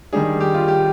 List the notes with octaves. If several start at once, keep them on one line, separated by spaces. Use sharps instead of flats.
D#3 G3 D4 G#4
G4
F4
G4